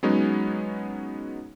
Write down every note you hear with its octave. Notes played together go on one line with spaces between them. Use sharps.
F#3 G#3 B3 C#4 D#4